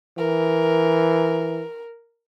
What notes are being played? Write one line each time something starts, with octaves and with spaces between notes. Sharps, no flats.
E3 A#4